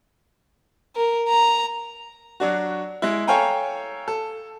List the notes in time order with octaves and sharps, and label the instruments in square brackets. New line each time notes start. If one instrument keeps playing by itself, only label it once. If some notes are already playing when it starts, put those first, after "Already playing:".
[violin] A#4
A#5
[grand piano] F#3 D4 F#4
G#3 E4
A4 C#5 F5 G5 G#5 A#5
A4